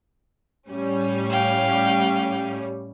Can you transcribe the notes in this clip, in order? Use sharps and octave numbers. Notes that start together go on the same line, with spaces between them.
A2 G3 C#4
F5 G5